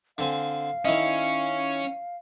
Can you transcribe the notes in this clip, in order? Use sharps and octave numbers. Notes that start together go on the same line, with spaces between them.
D3 C4 F5 G#5
D#3 C#4 E4 D#5